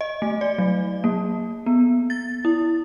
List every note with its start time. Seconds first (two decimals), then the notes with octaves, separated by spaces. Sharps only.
0.01 D#5
0.22 A3
0.41 D5
0.58 F#3
1.04 A#3
1.66 B3
2.10 A6
2.45 E4